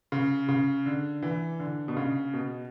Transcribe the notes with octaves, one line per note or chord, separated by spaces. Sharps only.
C#3
C#3
D3
E3
D3
B2
C#3
B2